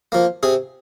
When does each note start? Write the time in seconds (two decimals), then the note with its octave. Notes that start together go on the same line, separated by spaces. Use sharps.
0.12 F3 A#3
0.43 C3 G#4